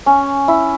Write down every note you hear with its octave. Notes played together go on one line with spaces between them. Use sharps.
C#4
E4